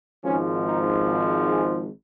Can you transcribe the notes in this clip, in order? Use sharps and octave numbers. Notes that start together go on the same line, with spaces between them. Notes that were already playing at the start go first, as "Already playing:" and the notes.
G#1 G#2 F3 C#4
D#4
G#4